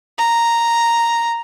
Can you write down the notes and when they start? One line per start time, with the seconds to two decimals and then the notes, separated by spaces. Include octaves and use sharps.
0.19 A#5